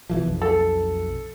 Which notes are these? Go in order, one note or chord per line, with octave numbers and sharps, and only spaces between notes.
B2 E3 F3
B1 F2
A4